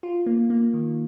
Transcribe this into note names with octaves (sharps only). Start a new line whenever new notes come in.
F4
A#3
A#3
D#3